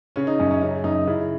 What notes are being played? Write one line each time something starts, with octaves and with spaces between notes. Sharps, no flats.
C#3 C#4
D#4
F#2 C#4
C#4
C#3 C#4
F#2 D#4
C#3 E4